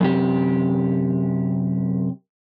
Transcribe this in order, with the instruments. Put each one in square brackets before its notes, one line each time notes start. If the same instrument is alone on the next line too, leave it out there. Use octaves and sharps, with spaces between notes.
[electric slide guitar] F#2 C3 G4